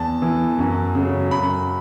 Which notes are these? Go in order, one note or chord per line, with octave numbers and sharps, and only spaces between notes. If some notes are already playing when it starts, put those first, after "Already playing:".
Already playing: E2 A5
E3
F#2
C#3 F#3
F#2 B5